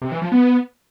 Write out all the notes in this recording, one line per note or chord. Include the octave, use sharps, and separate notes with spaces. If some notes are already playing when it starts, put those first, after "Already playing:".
C3
E3
F3
B3